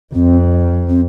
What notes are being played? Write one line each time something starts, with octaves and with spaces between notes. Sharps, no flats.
F2 C4
C4